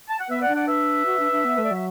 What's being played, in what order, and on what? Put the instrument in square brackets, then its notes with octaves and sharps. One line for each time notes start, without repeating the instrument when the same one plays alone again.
[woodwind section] A5
F#5
[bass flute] B3 [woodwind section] B4 E5
[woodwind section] D5 F#5
[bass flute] D4
[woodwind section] D5 F#5
B4 E5
[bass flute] F#4
D4
D4
B3
[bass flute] A3 [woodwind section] B4
[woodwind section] D5
[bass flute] F#3 [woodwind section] E5